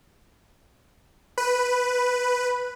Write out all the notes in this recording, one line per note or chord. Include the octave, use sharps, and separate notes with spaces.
B4